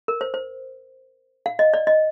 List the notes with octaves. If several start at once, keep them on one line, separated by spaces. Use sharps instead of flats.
A#4
C5
C5
F5
D#5
D5
D#5